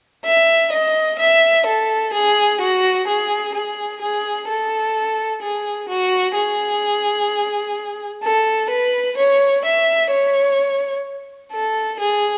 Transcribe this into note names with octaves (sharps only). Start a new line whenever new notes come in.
E5
D#5
E5
A4
G#4
F#4
G#4
G#4
G#4
A4
G#4
F#4
G#4
A4
B4
C#5
E5
C#5
A4
G#4